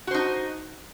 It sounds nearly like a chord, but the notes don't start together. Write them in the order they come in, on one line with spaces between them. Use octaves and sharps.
F#4 C5 D#4